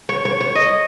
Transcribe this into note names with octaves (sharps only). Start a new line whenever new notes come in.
C#5
C#5
C#5
D#5